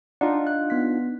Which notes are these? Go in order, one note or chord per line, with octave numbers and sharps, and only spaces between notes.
D4 D#4 F4 F#5
F#6
B3 B6